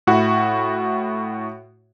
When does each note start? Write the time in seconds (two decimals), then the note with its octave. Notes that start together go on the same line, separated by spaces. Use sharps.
0.07 A2 E4 F#4 F#5